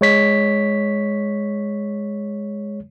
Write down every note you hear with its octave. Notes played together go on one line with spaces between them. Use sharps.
G#3 C#5 B6